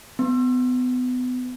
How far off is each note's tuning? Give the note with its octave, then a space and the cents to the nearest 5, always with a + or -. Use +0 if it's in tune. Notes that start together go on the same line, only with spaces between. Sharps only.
B3 +30